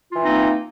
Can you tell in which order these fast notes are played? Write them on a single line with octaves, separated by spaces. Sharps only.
F4 E3 C4 D#4 A#3